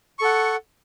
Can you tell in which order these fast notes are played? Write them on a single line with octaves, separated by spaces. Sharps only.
C#6 A4 F#5